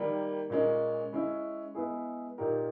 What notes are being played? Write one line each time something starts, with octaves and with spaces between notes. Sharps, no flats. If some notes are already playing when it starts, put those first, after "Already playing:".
Already playing: D#3 G3 A#3
A#2 G#3 C#4
G#3 C#4 E4
G#3 B3 E4 G#4
A#2 A#3 D#4 G4 A#4